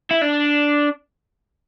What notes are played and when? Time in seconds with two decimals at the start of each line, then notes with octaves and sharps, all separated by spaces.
0.11 E4
0.22 D4